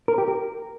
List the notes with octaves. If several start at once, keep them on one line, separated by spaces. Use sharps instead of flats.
A#4
G4
A#4